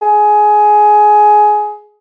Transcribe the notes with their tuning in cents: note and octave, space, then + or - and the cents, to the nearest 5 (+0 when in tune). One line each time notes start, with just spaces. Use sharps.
G#4 +15